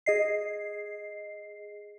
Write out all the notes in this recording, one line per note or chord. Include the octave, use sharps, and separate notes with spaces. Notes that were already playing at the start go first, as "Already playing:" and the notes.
G#4 D#5 C7